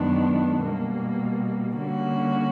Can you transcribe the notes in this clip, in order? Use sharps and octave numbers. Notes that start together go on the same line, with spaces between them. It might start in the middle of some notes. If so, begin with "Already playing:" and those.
Already playing: F#2 D#3 G#3 B3 D4
B2 G3 A#3
D3 G3 A#3 C#4 F#4